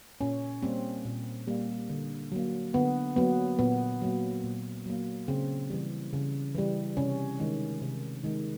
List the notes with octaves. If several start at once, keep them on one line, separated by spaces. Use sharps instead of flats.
A#2 C#4
G3 A#3 C4
A#2
G3 A#3
D3
F#3 A#3
D3 B3
F#3 A#3 B3
A#2 B3
F#3 A#3
A#2
F#3 A#3
C#3 C4
E3 G3
C#3
E3 G3
C3 C#4
D#3 G#3
C3
D#3 G#3